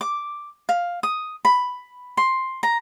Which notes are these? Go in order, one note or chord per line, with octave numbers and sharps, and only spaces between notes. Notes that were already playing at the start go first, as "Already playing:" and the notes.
D6
F5
D#6
B5
C6
A#5